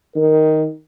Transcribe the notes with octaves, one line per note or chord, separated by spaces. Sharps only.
D#3 A#4